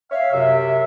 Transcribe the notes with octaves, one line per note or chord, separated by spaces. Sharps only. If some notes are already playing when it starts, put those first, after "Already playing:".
C#5 E5 F5
F#2 C3 E5